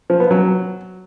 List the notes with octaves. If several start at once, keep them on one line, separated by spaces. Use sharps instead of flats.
F3
B3
F#3